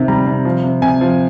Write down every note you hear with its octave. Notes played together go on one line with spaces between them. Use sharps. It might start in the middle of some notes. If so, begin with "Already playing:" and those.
Already playing: C3 D#3
G3 A#5
C3
F3
C3
C3 G#5
F3